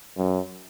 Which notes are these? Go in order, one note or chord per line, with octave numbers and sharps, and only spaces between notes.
F#2